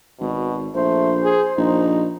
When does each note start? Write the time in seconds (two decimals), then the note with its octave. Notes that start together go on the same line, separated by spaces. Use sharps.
0.20 G#1 B2
0.75 A#1 A3 C5
1.23 G#4
1.57 A#1 D#4